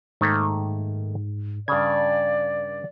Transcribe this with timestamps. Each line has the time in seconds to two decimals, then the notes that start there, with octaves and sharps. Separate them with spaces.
0.21 G#2 D#3 A3 A#3
1.68 G2 C#3 D5 G#6